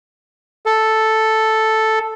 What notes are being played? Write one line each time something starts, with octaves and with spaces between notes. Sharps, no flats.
A4